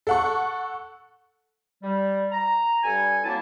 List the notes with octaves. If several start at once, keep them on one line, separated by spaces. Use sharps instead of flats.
A4 F#5 C#6
G3
A#5
G2 G3 A4 G#5
F#3 A#3 C4 E4 A5